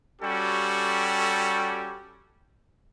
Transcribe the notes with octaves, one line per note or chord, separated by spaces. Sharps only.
G3 C#4 F#4 G4 A4